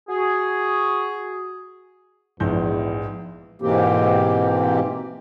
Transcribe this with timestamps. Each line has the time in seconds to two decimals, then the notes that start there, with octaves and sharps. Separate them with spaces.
0.09 F#4 G#4
2.40 A#1 E2 G#2 G6
3.62 G#2 B2 E3 A#3 C4 G4